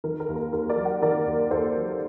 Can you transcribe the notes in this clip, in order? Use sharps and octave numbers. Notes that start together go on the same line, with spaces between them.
D#3 A#4
A#4
D#2
A#4
D#2 A#4
A#4 D5
F#3
D5 F#5
D#3 A#4 D5
D#2
D#2 A4 C5
F#3